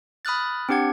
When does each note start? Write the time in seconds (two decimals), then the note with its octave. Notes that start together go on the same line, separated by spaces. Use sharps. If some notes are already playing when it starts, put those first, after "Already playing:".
0.25 B5 D#6 F6 F#6 A6
0.69 C4 D4 G4 F#5 G#6